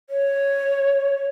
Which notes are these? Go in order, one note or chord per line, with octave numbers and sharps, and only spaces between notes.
C#5